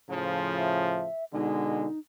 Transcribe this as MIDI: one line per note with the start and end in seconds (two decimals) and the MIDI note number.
0.10 1.07 45
0.10 1.07 49
0.10 1.07 53
0.58 1.24 76
1.33 1.86 47
1.33 1.86 50
1.33 1.86 56
1.33 1.99 63